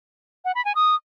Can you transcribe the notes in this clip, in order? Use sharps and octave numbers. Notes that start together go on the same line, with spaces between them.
F#5
B5
G#5
D#6